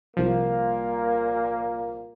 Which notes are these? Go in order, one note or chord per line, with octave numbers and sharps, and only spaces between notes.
C2 A#2 F3 A#3